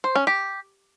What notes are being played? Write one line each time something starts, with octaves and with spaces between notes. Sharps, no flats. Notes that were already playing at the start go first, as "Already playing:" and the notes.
C5
C#4
G4